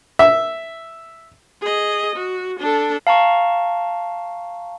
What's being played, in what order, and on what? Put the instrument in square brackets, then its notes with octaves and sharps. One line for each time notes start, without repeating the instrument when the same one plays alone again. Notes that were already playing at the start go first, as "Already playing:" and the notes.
[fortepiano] E5
[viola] G#4 D#5
F#4
D4 A4
[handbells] F5 A5 A#5 C#6